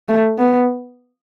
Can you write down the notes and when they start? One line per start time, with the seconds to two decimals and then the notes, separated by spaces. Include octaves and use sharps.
0.09 A3
0.38 B3